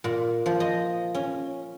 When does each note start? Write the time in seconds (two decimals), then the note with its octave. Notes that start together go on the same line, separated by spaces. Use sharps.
0.04 A#2
0.46 F3
0.60 D#5
1.15 C#4